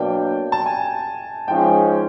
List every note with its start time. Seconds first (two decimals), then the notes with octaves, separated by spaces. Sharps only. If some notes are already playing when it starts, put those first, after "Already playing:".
Already playing: B2 F#3 A#3 D4 G5
0.52 A5
0.66 G#5
1.48 G#2 F3 G#3 C#4 G5